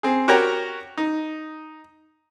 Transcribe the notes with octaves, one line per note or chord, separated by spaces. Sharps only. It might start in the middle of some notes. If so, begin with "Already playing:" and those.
C4 G#4
F#4 G4 A#4 C#5 G5 A#5
D#4